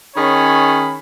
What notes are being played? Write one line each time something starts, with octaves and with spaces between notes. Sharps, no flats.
D#3 C#4 G#4 C#5 B5